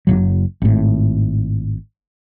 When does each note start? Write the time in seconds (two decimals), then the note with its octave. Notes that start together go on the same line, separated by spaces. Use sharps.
0.07 F#1 C#2 F#3
0.62 G#1 A2